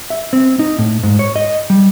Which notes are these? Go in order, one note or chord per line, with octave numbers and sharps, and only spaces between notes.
E5
C4
D#4
A2
G#2
C#5
D#5
G3